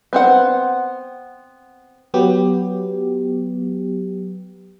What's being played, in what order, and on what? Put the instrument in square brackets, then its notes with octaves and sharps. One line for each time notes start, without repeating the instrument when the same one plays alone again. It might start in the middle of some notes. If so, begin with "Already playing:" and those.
[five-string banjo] B3 C4 F#5
[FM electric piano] F#3 B3 G4